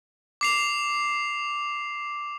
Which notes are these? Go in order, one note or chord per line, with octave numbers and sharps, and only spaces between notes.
D6 C7 F7